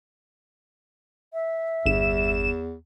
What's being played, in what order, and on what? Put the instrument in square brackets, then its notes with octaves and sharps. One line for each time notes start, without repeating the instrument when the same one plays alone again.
[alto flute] E5
[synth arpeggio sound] G1 E7 [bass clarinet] E2